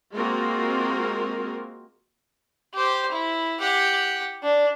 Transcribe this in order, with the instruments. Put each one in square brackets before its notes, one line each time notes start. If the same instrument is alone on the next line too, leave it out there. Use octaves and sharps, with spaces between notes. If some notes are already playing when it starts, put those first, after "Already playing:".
[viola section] G#3 A#3 C4 F4 F#4 A#4
[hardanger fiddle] G4 C5
E4
G4 F#5
D4